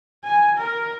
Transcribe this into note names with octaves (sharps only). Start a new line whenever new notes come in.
G#5
A#4